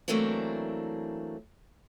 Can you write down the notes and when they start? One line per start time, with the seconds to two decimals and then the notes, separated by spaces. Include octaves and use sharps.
0.08 E3 F#3 A3 A#3 C4 D4